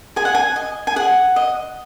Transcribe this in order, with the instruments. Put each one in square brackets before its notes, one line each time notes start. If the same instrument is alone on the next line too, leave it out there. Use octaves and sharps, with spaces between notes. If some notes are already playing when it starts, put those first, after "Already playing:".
[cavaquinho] G#4 G#5
F#5
G#5
D#5
G#5
G#4 F#5
D#5